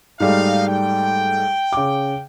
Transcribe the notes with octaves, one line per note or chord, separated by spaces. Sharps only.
G#2 G3 A3 D#4 F5
G5
C#3 D6